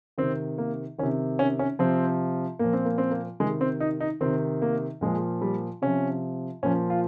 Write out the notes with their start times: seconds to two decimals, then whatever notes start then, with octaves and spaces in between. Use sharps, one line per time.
0.18 C3 D#3 C4
0.58 A#3
0.98 D#3 C#4
1.03 C3
1.39 C#4
1.59 C#4
1.79 C3 F3 C4
2.59 A#2 F3 A#3
2.73 C4
2.85 A#3
2.98 C4
3.11 A#3
3.40 C3 D#3 G#3
3.61 C4
3.80 D#4
4.00 D#4
4.21 C3 D#3 C4
4.62 A#3
5.01 A#2 F3 G#3
5.42 G3
5.82 C3 F3 C#4
6.63 A#2 F3 C#4
6.90 F4